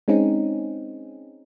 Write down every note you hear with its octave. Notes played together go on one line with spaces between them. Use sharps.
G#3 C4 C#4 D#4